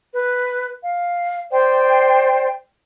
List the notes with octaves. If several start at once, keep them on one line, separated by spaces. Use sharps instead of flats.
B4
F5
C5 D5 G5